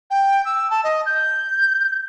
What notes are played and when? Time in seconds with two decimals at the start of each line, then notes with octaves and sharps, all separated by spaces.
0.11 G5
0.45 E6
0.70 A5
0.84 D#5
1.06 G6